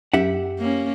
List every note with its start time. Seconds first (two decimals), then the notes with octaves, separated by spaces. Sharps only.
0.13 F#2 G4 E5 F#5
0.59 A#3 C#4